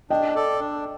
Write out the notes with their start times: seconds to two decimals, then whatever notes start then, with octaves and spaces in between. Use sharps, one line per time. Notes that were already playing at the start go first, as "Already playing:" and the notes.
0.10 D4 D#5 G5
0.35 A4 D5
0.60 D4